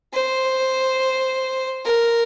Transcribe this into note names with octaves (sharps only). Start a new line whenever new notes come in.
C5
A#4